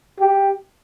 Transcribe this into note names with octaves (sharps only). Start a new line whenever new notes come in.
G4